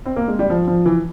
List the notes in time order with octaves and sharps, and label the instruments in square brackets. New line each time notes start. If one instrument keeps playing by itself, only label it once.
[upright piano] C4
A#3
G#3
G3
F3
F3
E3